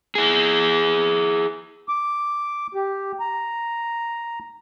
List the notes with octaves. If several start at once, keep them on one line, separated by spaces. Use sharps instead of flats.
E4 G#4
D6
G4
A#5